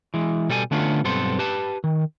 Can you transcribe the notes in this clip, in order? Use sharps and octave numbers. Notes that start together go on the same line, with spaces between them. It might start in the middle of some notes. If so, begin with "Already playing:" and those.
E3 G#3
B2 G3 A4 F#5 G#5
D3 A3 B3 C#4 D4 F4
B1 G2 B3 C4 A4 C6
G4 B4 A5
D#3